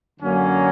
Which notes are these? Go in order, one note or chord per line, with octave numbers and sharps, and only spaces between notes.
F#2 D3 F#3 A#3 C#4